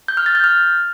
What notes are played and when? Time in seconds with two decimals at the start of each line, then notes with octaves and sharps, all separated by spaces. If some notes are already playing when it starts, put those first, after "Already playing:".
0.08 G6
0.17 F6
0.26 A6
0.35 G6
0.44 F6